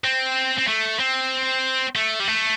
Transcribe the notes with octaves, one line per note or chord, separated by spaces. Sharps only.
C4
C4
A3
C4
A3
G3
A3